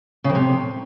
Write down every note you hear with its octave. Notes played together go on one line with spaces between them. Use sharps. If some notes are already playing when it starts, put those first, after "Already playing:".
C#3
F2
C3